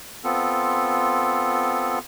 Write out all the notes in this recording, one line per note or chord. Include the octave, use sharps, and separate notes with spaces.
B3 C4 F4 A4